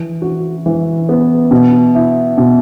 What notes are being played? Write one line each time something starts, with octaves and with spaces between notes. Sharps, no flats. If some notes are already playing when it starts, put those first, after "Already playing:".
Already playing: E3
F#4
E3
B3
B2
E4
B2